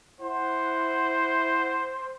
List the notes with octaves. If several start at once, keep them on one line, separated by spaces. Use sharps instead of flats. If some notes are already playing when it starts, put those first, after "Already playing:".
E4 C5 F#5